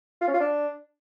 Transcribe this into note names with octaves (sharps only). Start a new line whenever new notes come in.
F4
C#4
F4
D4